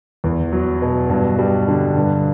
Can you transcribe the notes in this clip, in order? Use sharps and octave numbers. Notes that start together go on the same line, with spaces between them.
E2
F#3
B2
G2
G3
D3
G2